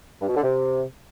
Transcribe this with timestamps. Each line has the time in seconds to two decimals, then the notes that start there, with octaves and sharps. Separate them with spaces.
0.21 G2
0.29 B2
0.36 D3
0.43 C3